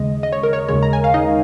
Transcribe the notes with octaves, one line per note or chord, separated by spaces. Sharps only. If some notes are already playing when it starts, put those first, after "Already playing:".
Already playing: D#2 C#3 G#3 D#5
D#5
C#5
A#4
C#5
D#2 C#3 G#3 C#5
A#5
G#5
F5
D#4 D#5